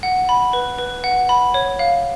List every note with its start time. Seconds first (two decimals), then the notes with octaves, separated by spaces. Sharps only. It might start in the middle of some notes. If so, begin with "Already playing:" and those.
0.03 F#5
0.29 B5
0.53 B4
0.78 B4
1.04 F#5
1.29 B5
1.54 C#5
1.79 F5